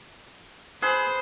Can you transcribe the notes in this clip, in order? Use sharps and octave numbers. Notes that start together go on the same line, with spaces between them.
G#4 B4 C5